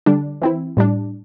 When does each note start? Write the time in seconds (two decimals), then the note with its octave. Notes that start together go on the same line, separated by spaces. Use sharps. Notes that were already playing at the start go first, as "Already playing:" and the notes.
0.06 D3 G3 D4
0.42 E3 C4 E4
0.77 A2 G3 D4